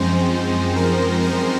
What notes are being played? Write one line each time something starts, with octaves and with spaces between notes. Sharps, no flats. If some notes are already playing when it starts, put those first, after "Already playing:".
Already playing: F#2 F3 G#3 C4 D#4 C5
A#4
A#4